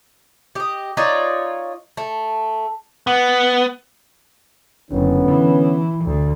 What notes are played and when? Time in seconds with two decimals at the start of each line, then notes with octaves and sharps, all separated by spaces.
0.55 G4 D#5
0.97 D#4 F4 C#5 D5
1.97 A3
3.07 B3
4.91 F#1 D3 B3 C#4
5.28 E3
6.05 D2